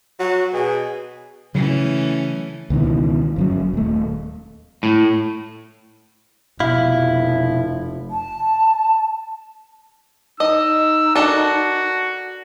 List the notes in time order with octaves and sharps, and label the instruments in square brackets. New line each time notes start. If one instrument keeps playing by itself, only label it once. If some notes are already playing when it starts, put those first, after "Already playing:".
[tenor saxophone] F#3 [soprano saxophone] F#4
[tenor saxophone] B2 [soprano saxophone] G#4
[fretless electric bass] C#3 F#3 [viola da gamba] E3 A3 C#4
[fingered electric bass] C#2 B2 D#3 E3
G1 F#2 F#3
D#1 A3
[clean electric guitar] A2
[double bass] F1 [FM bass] B2 [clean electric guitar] E4 [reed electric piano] F5
[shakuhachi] A5
[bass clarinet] D#4 [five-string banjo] D#5 [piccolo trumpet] E6
[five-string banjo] D4 A4 A#4 [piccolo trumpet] F#4